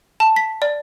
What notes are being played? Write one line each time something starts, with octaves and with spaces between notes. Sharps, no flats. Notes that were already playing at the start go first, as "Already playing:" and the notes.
A5
B6
D5